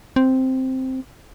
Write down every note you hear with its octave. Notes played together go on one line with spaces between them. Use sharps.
C4